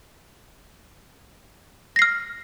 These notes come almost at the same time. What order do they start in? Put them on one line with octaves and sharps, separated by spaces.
A#6 C7 F6